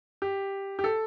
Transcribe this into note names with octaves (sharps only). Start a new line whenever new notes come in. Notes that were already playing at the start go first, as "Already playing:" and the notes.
G4
G4
A4